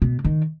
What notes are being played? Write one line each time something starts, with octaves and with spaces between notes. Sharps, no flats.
B2
D#3